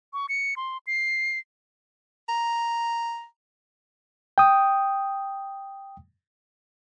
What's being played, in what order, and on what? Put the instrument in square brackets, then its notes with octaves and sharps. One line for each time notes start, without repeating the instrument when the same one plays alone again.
[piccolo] C#6
C#7
C6
C7
[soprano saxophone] A#5
[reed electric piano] G5 D#6